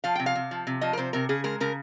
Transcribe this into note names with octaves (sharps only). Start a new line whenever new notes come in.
F3 F5
C3 G5
F5
C3
F3
C3
F3 D#5
A#4
C3 C5
C3 A#4
C#3 G#4
G#3 A#4
C#3 A#4